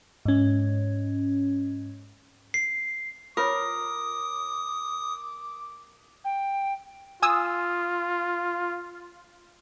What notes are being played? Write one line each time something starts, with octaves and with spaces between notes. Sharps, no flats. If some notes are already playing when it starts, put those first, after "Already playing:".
G#2 C#4
C7
F4 A#4 C#5 D6 D#6
G5
F4 G#5 D#6 E6